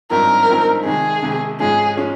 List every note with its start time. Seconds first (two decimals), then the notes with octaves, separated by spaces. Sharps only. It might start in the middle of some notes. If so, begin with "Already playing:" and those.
0.10 G#1 G2 F3 C4 D#4 A#4
0.48 G#1 G2 F3 C4 D#4
0.85 F2 C3 D#3 G#3 G#4
1.22 F2 C3 D#3 G#3
1.59 G#2 F3 G#3 C#4 G#4
1.97 F3 G#3 C#4